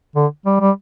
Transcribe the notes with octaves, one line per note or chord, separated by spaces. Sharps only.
D3
G3
G3